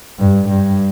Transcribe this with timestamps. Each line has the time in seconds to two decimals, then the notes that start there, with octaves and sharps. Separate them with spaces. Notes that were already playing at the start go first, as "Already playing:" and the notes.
0.19 G2
0.49 G2